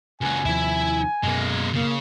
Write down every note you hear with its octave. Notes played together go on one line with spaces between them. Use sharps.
C#2 F#4 G#5
D#2 C3 F3 E4 E5
F#2 B2 G#3 A#3
C#3 A#3